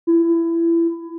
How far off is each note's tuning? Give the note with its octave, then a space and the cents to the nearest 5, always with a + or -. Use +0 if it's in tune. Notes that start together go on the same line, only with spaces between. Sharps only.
E4 +25